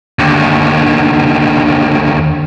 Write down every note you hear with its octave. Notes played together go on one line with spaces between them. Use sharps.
D#2 D3